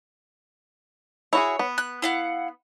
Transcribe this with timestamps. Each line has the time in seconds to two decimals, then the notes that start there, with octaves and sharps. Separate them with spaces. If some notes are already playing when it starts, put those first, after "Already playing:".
1.33 E4 F#4 G#4 C#5
1.59 B3
1.78 F#6
2.02 E4 F5 F#5